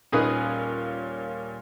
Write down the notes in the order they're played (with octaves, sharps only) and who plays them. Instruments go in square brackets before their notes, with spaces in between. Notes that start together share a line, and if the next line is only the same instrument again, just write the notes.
[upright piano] D#1 A#2 C#4 [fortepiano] D#4 G#4 B4